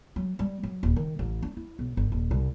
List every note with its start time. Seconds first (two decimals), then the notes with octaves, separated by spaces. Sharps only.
0.16 F#3
0.39 G3
0.63 F#3
0.83 D#1
0.96 D#3
1.19 A1
1.42 D4
1.57 E4
1.79 B1
1.97 G1
2.12 D#1
2.31 C2